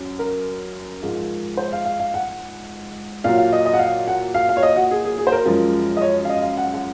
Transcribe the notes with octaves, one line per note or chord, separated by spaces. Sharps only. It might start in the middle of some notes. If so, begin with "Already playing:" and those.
Already playing: F#2
A#4
G#2 F3 G#3
C5
F5
F5
F5
F#5
A#2 F#3 F5
F5
D#5
D#5
F#5
F5
F#5
F5
F5
C#5
D#5
F#4
G#4
G#4
G#4
C5
A#4
F#2 F3 G#3
D#5
C#5
F5
D#5
F5
F#5
F#5